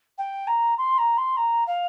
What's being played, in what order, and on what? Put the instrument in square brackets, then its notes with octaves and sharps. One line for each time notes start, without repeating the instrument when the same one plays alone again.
[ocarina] G5
A#5
C6
A#5
C6
A#5
F5